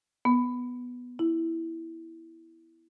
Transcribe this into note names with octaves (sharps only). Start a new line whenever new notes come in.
B3
E4